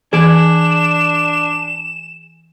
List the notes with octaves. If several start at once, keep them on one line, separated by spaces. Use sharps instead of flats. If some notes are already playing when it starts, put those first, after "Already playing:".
E3 D4 G#4 D5 G#6 E7